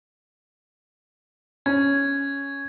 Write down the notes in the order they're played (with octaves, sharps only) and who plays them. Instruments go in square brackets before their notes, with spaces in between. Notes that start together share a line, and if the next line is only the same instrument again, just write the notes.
[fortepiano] C#4 [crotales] G#6